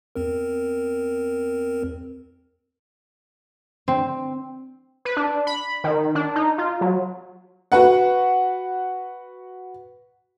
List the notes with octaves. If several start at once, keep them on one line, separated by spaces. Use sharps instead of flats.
E2 C4 A#4
C4
B4
D4
B5
D#3
D4
D#4
F4
F#3
F#4 B4 F#5